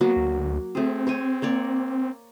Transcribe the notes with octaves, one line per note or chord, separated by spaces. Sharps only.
F#3 A#3 B3 F#4
D2
A3 C4 G#4
C5 C#5 G#5
A#3 C#5 D5